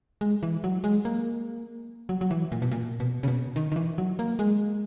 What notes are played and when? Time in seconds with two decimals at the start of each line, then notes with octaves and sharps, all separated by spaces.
0.21 G#3
0.43 E3
0.64 F#3
0.84 G#3
1.05 A#3
2.09 F#3
2.21 F#3
2.31 E3
2.52 A#2
2.62 B2
2.72 A#2
3.00 B2
3.23 C#3
3.28 B2
3.56 D#3
3.72 D#3
3.76 E3
3.98 F#3
4.19 A#3
4.39 G#3